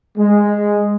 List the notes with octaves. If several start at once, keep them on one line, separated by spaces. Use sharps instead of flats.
G#3